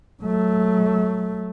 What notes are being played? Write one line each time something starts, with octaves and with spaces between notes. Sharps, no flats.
F#3 A3